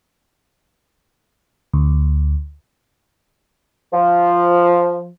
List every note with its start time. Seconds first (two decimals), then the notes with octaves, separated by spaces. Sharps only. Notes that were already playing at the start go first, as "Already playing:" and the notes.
1.73 D2
3.93 F3